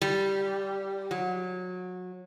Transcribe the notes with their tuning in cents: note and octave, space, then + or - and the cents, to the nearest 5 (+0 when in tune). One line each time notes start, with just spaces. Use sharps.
G3 -5
F#3 -25